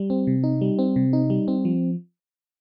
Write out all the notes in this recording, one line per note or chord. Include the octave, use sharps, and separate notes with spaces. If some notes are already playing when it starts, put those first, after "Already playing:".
Already playing: G3
C4
C3
D#4
G3
C4
C3
D#4
G3
C4
F3